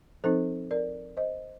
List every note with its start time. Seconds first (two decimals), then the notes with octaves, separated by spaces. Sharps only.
0.24 F3 C4 D#4 A4 C5
0.71 A#4 D5
1.17 C5 D#5